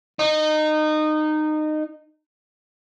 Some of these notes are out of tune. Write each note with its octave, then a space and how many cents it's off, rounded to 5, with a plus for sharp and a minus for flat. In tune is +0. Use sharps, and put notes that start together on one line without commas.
D#4 -20